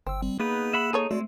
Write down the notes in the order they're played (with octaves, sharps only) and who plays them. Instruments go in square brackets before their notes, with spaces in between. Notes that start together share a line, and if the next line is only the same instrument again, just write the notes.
[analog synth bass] G1 [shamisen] C5 [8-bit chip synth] G5 E6
[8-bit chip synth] G3 C4
[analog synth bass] A#3 [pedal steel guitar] B3 D#4 B4 [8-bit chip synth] G#4
[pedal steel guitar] E5 F#5 B5
[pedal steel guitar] D#4 [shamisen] G#4 A4 C#5
[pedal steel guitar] G#3 C4 [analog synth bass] A3 [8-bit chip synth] F#4 D5